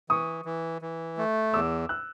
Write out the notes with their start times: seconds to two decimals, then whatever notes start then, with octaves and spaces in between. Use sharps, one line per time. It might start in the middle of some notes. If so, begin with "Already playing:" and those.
0.09 E3 C#6 D#6
0.45 E3
0.82 E3
1.18 A3
1.53 E2 D6 E6
1.89 E6 F#6